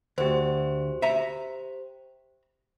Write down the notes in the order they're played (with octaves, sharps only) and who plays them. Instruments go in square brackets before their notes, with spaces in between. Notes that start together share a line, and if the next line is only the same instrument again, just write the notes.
[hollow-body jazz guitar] D2 [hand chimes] G4 C5
[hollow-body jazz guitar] E5 A#5